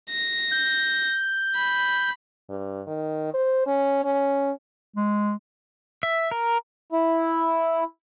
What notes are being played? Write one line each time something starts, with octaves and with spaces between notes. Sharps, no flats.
A#6
G6
B5
G2
D#3
C5
C#4
C#4
G#3
E5
A#4
E4